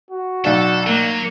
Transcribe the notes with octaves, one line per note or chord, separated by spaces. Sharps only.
F#4
B1 D4 A4
F#3 A#3